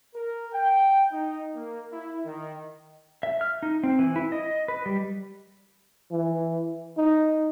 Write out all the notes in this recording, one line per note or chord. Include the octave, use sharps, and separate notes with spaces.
A#4
G5
D#4
A#3
E4
D#3
E5
F6
D#4
C4
E3
E4
D#5
B4
G3
E3
D#4